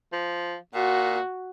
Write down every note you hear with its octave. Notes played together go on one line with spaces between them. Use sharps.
F3
A#2 F#4